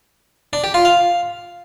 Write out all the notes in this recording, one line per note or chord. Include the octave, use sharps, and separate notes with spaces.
D4
G4
F4
F5